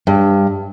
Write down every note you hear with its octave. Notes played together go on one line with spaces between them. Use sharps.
G2